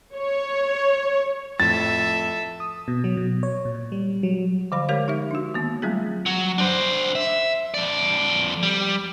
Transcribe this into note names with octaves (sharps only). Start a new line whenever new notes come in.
C#5
F2 A2 A4 E5 A6
D#6
B2
F#3
B2
C#5
A#2
G3
F#3
D3 F3 C5 F5 B5
G#3 G4 A#4 C#5 F5
D#4 G4 E5
D4 F#4
D#3 A#3 B3
F#3 G3 A3 C4 F4 G#4
F#3
D4 C5
E5
F2 D5
G3